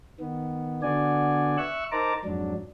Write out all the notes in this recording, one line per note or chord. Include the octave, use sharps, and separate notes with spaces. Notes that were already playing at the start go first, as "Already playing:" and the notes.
D#3 B3
D3 B3 D4 F#4 D5 G#5
E5 C#6 E6 F#6
D#4 A#4 C5 A5 A#5 D6
F2 G#2 F#3 D4